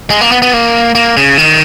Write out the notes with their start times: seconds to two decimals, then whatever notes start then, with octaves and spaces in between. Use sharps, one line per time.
0.10 G#3
0.21 A#3
0.31 B3
0.42 B3
0.53 A#3
0.95 A#3
1.17 C#3
1.38 D#3